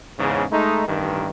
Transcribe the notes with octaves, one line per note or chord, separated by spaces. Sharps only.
E2 G#2 C#3
G#3 A3 D#4
A1 G2 D#3